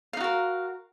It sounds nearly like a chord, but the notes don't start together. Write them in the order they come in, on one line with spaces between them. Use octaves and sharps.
F5 D#4 F#4 A#4